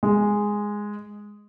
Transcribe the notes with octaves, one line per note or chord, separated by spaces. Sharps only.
G#3